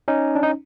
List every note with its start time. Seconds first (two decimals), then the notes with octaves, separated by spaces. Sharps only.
0.08 C#4 D#4
0.35 D4
0.43 D#4